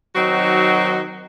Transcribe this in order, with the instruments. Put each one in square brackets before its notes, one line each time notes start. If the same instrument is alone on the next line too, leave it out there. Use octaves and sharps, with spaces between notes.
[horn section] D#3 F#3 C4 D#4 F#4